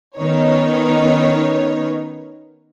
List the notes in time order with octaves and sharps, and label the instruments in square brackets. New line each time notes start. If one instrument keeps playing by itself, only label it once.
[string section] D#3 B3 C#4 D#4 C#5